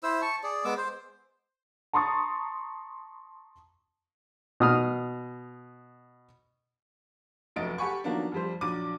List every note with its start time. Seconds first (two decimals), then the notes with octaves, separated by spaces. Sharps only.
0.03 E4 C5 E6
0.22 A5 C#6
0.43 G#4 D5
0.65 G#3 B3 D6 E6
0.77 C5
1.93 A5 A#5 C6 C#6 D#6 A6
4.60 B2 D#6 F6
7.56 F1 F#2 A3 D#5 A6 D7
7.78 G4 A4 F#5 G#5 B5 C#6
8.04 D#3 F3 F#3 A#3 B3 D4
8.32 F2 G3 C5
8.61 A#1 F#3 D4 D6 D#7